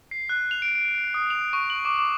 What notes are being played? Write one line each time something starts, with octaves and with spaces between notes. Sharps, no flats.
C7
F#6
F7
D7
D7
D#6
F7
C#6
F#7
D6
D6